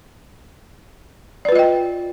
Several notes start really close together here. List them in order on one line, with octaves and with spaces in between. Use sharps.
D5 B4 F4 D#5 G5